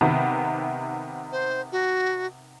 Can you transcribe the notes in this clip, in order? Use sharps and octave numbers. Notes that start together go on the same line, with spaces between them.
C3 D#3 B3
C5
F#4